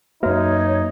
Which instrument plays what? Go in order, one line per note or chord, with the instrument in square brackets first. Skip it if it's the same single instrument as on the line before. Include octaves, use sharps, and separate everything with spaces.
[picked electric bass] F#2 A#3 [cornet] D#4 [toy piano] F#4 B4 E5 [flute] C#5